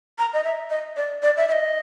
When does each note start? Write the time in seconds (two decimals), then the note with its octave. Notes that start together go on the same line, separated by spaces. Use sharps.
0.19 A#5
0.33 D#5
0.44 E5
0.70 D#5
0.97 D5
1.22 D5
1.37 E5
1.48 E5
1.52 D#5